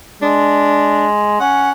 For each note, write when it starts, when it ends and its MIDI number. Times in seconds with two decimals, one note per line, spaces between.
0.22 1.38 56
0.22 1.06 62
1.40 1.71 61
1.40 1.72 78